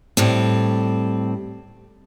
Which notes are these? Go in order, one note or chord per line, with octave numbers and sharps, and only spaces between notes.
A2 G3 C4